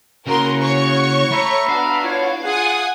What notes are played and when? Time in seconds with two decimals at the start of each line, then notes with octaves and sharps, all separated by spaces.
0.27 C#3 A#3 E4 F#4 A#4 C6
0.61 C#5 C#6
1.31 A3 E5 A#5 B5
1.69 B3 D4 F#4 F5
2.03 E4 F4 C#5
2.44 F4 G#4 F#5 G#5 D#6